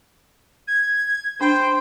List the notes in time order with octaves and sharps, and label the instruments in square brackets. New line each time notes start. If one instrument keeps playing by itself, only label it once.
[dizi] G#6
[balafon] D4 [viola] C5 [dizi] G5